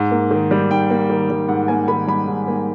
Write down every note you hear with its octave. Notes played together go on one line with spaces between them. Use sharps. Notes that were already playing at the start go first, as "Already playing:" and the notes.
Already playing: G#2
A#3
D#3
G3
G#2 G5
A#3
D#3
G3
G#2 F#5
A#3 G#5
D#3 B5
G3 B5
G#2
A#3